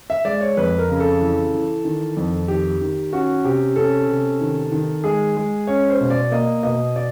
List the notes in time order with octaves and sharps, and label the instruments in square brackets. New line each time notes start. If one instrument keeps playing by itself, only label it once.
[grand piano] E5
G#3 D5
C#5
F2 B4
A#4
C#3
A4
E3
E3
D#3
F2
D#3 G4
D#3
C#4 F#4
C3 G4
C#4 A4
C3
D#3
D#3
G#3 G#4
G#3
C#4 C#5
C5
B2
D5
A#3 D#5
B2 D#5
D5